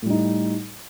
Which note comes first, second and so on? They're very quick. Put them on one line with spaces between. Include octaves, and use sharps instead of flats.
A2 G3 D#4